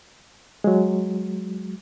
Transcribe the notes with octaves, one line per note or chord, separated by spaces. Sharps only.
F#3 G#3